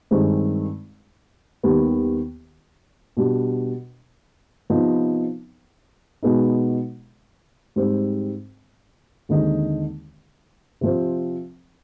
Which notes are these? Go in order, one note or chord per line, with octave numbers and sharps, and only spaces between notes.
G2 D#3 G#3 C4 D#4
D#2 D#3 G3 B3
B2 G3 D4
C3 F3 B3 D#4
B2 G#3 B3 D#4
G#2 G3 C4
D#2 D3 G#3 C4 D#4
C3 F3 C4